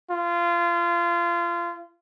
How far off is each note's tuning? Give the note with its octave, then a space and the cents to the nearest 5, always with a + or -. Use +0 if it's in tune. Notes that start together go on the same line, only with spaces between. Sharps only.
F4 -25